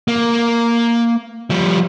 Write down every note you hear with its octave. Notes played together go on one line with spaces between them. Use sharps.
A#3
F3 G3